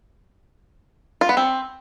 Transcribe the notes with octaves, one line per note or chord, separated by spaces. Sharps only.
F4
B3
C4